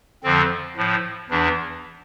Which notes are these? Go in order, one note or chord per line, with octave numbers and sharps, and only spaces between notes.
F2 D3 F3 C4
A2 F3
E2 E3 D4